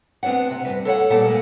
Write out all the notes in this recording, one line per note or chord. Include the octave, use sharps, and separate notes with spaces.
B3 C4 D4 C#5 F#5
C3
G2 B4
A4 C#5 F5 F#5
A#2 G3 B3 A4 F#5
G#3 A#3